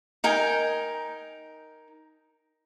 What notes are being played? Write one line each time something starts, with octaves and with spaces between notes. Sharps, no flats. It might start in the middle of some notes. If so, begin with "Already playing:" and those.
D#4 A#4 G5 G#5